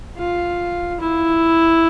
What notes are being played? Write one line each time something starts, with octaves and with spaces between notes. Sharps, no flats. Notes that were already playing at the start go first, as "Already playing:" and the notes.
F4
E4